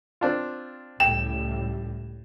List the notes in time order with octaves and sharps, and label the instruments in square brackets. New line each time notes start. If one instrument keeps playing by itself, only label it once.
[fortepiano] C4 D4 F4
[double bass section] C#2 A2 G3 [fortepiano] G5 [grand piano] E7